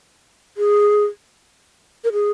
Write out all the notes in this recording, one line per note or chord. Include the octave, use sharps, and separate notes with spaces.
G#4
A#4
G#4